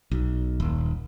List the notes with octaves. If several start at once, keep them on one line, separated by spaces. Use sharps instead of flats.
B1
D#1